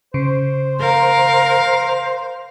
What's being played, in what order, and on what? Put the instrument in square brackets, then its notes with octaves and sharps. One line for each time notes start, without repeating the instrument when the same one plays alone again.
[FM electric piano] C#3 [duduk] C5
[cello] A#4 [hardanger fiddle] F5